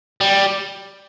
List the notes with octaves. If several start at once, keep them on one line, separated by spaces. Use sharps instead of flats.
G3